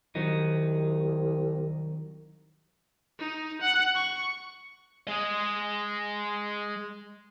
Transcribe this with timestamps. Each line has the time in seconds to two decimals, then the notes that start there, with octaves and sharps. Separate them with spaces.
0.15 C2 D#3 F#3 D#4
3.19 D#4
3.61 F#5
3.95 C#6
5.07 G#3 D#5